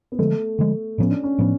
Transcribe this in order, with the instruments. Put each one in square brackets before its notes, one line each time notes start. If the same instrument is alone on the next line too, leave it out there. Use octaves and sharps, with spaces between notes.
[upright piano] B3
[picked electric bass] D3 F3 G#3 [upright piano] A3
[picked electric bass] D3 F3 G#3
[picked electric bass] A2 F3 B3 [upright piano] C#4
[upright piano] D4
C#4
[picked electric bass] A2 F3 B3